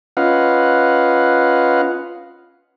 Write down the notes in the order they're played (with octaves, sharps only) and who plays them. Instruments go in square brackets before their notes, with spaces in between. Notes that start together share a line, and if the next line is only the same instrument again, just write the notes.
[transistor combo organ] C#4 F4 B4 D#5 F5 F#5